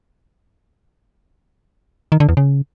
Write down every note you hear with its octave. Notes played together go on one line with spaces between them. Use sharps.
D#3
D3
E2
C#3